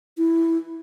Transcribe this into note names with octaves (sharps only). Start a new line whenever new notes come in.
E4